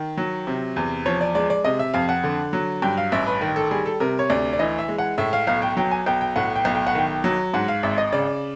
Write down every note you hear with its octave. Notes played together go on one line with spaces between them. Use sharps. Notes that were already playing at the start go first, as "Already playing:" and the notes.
Already playing: D#3
F#3
C3
E2
F3 C#5
D5
G#3 D5
D5
C3 D#5
E5
F2 F5
F#5
D3
F#3
G2 G5
F5
A1 E5
B4
D#3
A4
G3 G#4
A4
C3 A#4
C#5
D2 D5
D5
E3 D#5
E5
G#3
F#5
A2 E5
F5
B1 F5
G5
F#3 G5
G#5
B1 G5
G5
A2 F#5
G5
B1
G5
F#5
D#3 G5
F#3
G#2 F#5
F5
G#1 E5
D#5
C#3 D5